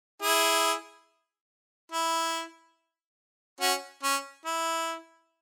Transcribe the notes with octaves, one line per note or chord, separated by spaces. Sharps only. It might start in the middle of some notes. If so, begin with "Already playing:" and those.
E4 G#4
E4
C#4 F#4
C#4
E4